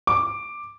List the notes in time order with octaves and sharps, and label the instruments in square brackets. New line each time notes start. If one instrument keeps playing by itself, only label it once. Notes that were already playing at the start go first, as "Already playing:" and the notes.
[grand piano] D6